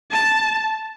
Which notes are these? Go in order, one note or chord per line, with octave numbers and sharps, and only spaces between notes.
A5